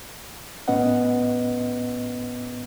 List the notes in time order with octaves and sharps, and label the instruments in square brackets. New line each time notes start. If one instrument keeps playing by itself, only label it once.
[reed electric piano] A2 B3 C#4 B4 D#5 F#5